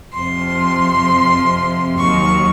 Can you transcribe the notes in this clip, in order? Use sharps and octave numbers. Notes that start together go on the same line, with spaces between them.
F2 C3 F3 C6
D#2 D#3 F#3 C#6